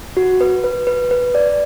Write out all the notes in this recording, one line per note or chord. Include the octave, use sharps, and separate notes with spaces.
F#4
B4
B4
B4
B4
D5